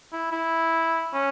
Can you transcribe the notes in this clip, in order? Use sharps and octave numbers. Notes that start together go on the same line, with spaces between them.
E4
E4
C#4